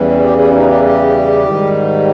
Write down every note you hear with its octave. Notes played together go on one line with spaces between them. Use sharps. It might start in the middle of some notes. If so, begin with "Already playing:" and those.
Already playing: E2 C#3 E3 G3
G4
G#4
C#4
D#4
G4
G4
G#2 D#3 G3